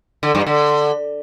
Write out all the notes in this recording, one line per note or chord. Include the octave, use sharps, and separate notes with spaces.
D3
G2
D3